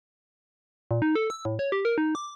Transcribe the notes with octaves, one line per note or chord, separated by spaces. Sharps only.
A#2
D#4
A4
E6
A2
C#5
G4
A#4
D#4
D6